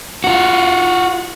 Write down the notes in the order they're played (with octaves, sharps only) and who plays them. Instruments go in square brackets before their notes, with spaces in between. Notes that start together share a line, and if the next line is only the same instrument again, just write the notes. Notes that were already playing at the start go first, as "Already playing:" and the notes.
[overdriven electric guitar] F4 F#4